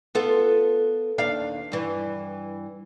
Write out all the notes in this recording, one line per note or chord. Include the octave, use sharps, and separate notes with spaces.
B3 F4 A4
D#2 D4 F5
G2 E3